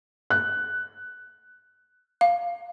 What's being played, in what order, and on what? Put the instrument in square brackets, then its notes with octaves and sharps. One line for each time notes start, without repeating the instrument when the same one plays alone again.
[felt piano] F#6
[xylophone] F5